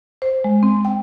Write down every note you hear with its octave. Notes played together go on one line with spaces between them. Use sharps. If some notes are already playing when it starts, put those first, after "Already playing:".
C5
G#3
C4
G5